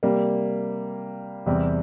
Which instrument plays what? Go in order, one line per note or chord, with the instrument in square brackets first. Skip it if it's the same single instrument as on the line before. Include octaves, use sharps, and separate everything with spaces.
[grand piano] C3 G3 A#3
E2 C3 G3